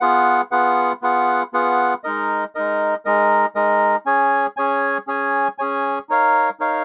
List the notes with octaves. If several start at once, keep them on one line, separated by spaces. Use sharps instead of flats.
B3 F4 G#4 B4 F#5
B3 F4 G#4 B4 F#5
B3 F4 G#4 B4 F#5
B3 F4 G#4 B4 F#5
G#3 D#4 A#4 D#5
G#3 D#4 A#4 D#5
G#3 D#4 A#4 D#5
G#3 D#4 A#4 D#5
C#4 G#4 C#5 G#5
C#4 G#4 C#5 G#5
C#4 G#4 C#5 G#5
C#4 G#4 C#5 G#5
D#4 A#4 C#5 F5
D#4 A#4 C#5 F5